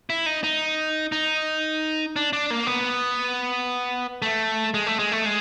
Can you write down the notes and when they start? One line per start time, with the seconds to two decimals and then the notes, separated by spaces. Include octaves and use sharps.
0.10 E4
0.26 D#4
0.44 D#4
1.12 D#4
2.16 D4
2.33 D4
2.51 A#3
2.67 B3
4.22 A3
4.74 G#3
4.87 A3
4.99 G#3
5.12 A3
5.26 G#3